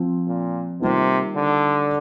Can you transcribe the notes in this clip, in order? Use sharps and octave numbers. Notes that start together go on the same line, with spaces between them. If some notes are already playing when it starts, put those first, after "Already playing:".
Already playing: F3 C4 F4
A#2
C3 D#3 G3 A#3 F4
D3